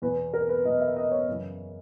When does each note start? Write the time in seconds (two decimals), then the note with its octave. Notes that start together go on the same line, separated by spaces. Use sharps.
0.02 E2 B2 B4
0.34 A#4
0.49 B4
0.65 E2 B2 D#5
0.81 E5
0.96 D#5
1.11 C#5
1.28 F#2 C#3 E3